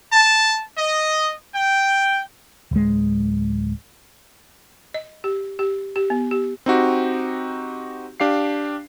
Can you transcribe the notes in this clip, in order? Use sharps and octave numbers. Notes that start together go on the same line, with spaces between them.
A5
D#5
G5
D1 G#3
D#5
G4
G4
G4
B3
G4
C4 D#4 F#4 G4
D4 G4 F5 C7